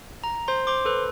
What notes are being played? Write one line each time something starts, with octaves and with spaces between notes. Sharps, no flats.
A#5
C5 C6
C5 C6 D6
A4 B4